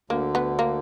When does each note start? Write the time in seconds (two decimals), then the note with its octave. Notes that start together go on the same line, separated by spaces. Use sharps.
0.10 D2 D3 A#3
0.35 B3
0.59 A#3